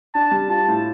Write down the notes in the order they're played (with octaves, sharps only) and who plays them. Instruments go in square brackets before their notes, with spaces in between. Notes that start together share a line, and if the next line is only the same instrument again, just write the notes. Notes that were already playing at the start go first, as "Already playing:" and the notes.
[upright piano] D4 [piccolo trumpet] A5
[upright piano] G3
[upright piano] F4 [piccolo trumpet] A5
[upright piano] A2